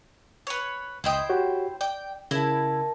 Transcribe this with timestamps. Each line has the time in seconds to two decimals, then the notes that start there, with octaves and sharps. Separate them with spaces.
0.47 B4 C#5
1.04 C#2 E4 C5 D#5 G5 D#6
1.29 F#4 G4 C#5
1.81 D5 G5
2.31 C#3 E4 A#4 A5